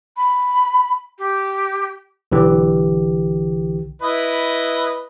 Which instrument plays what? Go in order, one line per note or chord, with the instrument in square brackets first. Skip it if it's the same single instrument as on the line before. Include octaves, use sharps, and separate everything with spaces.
[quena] B5
G4
[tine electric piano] B1 D3 E3 G4
[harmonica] E4 B4 D#5